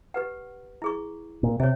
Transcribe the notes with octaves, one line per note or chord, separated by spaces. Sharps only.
G4 B4 F#5
E4 G#4 C#6
A#2
C3 C#5 E5